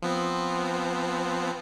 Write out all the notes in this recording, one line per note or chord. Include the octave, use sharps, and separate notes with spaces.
F3 B3 C4